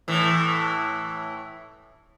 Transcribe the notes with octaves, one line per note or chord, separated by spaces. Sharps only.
A2 E3